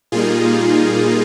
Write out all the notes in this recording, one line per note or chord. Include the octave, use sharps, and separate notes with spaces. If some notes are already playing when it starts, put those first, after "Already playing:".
A#2 G3 A#3 D#4 F4 G#4